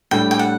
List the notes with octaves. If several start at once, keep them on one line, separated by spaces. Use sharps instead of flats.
A2 G3 D4 A4 G5
G5
F#5